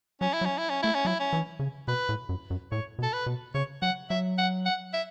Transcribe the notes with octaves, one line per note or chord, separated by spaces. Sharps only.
F#3 C#4
E4
F#3
C#4
E4
C#4
A3 E4
C#4
F#3 E4
C#4
E3
C#3
B2 B4
A2
F#2
F#2
A2 C#5
B2
A4
B4
B2
C#3 C#5
F#3 F#5
F#3 E5
F#5
F#5
E5